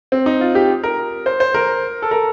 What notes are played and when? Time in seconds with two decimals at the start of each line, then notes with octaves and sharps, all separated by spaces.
0.12 C4
0.26 D#4
0.41 F4
0.55 G4
0.83 A#4
1.26 C5
1.40 C5
1.54 A#4
2.02 A4
2.11 A#4